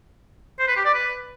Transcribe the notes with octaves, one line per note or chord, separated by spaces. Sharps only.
C5
B4
G4
D5
B4